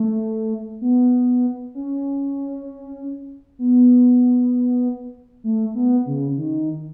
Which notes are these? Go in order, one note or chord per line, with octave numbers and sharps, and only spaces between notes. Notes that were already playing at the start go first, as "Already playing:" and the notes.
Already playing: A3
B3
C#4
B3
A3
B3
C#3
D#3